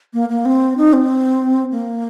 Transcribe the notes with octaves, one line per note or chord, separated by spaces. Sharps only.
A#3
A#3
C4
D#4
C4
A#3